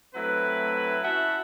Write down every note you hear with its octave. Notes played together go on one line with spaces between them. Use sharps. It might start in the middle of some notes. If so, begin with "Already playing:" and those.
F#3 A3 C4 E4 B4
C#4 E4 F#4 E5 F#5 A5